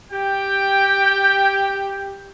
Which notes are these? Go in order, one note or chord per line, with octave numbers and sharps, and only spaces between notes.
G4 G5